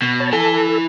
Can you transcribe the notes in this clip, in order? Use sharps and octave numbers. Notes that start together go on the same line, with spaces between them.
B2
C#5 A5
E4 A4 G#5